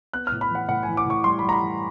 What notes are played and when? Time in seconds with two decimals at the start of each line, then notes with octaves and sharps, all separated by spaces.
0.13 B3 F#6
0.27 F6
0.32 A2
0.41 B5
0.50 E3 F#5
0.68 A2 F#5
0.83 G#5
0.88 E3
0.97 D6
1.06 A2 C#6
1.24 G3 C6
1.39 B5
1.43 G3
1.49 A#5
1.52 B5
1.61 E3